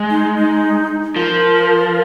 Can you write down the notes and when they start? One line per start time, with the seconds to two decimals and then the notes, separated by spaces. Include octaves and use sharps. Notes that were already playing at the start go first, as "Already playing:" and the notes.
Already playing: G#3
0.10 D#4
0.36 D#4
1.16 F3 A#4